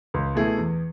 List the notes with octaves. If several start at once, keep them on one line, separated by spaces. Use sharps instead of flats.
C#2
B2 A3 E4 G#4
E2